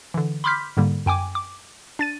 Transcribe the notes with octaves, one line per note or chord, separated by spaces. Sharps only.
D3 E3
B5 C6 D6 F6 G6 B6
G#2 D3 G3 A#3
F#2 G5 G#5 D6
D6
D4 A6 D#7